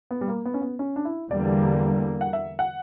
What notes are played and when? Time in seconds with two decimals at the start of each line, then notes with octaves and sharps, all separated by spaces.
0.11 B3
0.21 G3
0.28 A#3
0.45 B3
0.54 C#4
0.62 B3
0.79 C#4
0.96 D4
1.05 E4
1.30 E2 D3 G3 A#3 D5
2.21 F#5
2.33 E5
2.59 F#5